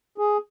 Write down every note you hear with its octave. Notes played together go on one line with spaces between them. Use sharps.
G#4